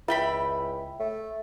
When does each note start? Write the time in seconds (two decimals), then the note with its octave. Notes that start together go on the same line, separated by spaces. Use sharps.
0.08 C#2 E4 F4 E5 G5 B5
1.00 A3